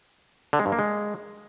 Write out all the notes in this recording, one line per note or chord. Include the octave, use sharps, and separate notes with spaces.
D3
G#3
G2
A#3
G#3